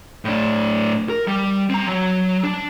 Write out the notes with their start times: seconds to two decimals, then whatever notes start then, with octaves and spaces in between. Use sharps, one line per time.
0.25 A2 D4
1.09 A#4
1.28 G3
1.70 C4 A#5
1.86 F#3
2.43 D4